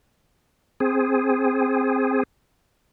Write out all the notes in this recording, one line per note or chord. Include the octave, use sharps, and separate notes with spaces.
C4 G#4